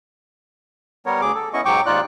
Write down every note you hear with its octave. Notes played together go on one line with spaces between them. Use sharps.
G3 B3 A#4 C#5
D2 G#4 D6
A4
B3 C#4 E4 D#5 C#6
G#2 F#3 G5 C#6 D6
D#2 G#2 D#4 F4 D5 F#6